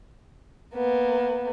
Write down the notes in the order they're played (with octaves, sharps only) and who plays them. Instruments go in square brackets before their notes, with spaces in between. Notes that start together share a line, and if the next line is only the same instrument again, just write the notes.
[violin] A#3 B3